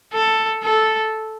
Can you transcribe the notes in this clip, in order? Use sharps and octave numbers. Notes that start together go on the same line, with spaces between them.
A4
A4